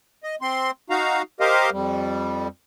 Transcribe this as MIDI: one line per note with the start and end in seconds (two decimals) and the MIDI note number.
0.24 0.35 75
0.41 0.71 60
0.41 0.71 84
0.90 1.22 63
0.90 1.22 66
0.90 1.22 77
0.90 1.22 82
1.40 1.70 67
1.40 1.70 70
1.40 1.70 72
1.40 1.70 75
1.40 1.70 77
1.72 2.48 41
1.72 2.48 55